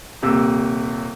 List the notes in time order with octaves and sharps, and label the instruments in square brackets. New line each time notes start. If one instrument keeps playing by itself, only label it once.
[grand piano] D#1 C3 A#3 E6